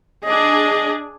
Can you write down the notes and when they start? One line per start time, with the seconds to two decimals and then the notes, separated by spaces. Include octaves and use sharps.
0.24 D4 G#4 D#5